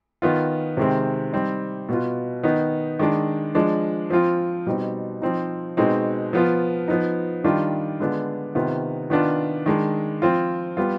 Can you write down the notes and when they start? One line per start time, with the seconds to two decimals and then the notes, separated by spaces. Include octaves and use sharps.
0.22 D#3 B3 F4
0.77 C3 D#3 G#3 C4
1.33 G3 C4 D#4
1.89 B2 B3 F4
2.44 D#3 B3 D#4
2.99 D#3 G#3 D4
3.55 F3 G#3 D4
4.10 F3 C4 F4
4.66 B2 G3 C4 D#4
5.22 F3 C4 D#4
5.77 B2 G#3 C4 D#4
6.33 F3 B3 F4
6.88 F3 B3 D#4
7.44 D#3 G3 D4 F4
8.00 D3 G#3 B3 D4 F4
8.55 C3 D#3 B3 F4
9.10 D#3 B3 D4 F4
9.66 D#3 G#3 D4
10.22 F3 C4 F4
10.77 G3 B3 F4